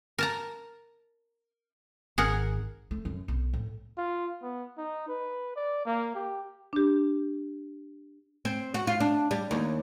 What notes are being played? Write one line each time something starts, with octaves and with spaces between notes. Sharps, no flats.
A#4 A5 A#5
G#1 G#4 A#4 F#5
A3
F#2
B1
A2
F4
B3
D#4
B4
D5
A#3
G4
D4 G4
C4
F#4
F4
D4
G3
D#2